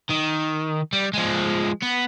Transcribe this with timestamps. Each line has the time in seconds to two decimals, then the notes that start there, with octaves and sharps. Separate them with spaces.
0.09 D#3
0.93 G3
1.14 F3 G#3
1.83 B3